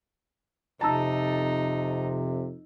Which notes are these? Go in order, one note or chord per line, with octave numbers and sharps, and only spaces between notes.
F2 C3 D#4 A5 A#5 E6